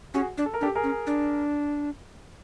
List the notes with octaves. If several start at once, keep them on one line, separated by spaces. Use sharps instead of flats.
C#4 F#4 G#4
D4
A4
A#4
D4 G4 A4
G#4 A#4
C#4
D4